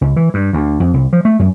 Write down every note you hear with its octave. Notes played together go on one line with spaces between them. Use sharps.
C#2
E3
G2
D2
F2
C2
F3
A3
F#2